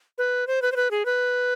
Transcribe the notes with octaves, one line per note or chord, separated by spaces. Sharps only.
B4
C5
B4
C5
B4
G#4
B4